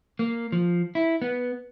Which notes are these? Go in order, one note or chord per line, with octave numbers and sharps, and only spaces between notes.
A#3
F3
E4
B3